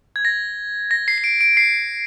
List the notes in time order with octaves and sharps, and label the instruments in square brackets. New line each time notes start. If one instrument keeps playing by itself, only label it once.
[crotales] G#6
A#6
A#6
C7
C7
D7
D7
C7